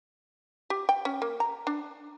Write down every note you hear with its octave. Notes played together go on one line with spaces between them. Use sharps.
G4
G5
C#4
A#3
A#5
D4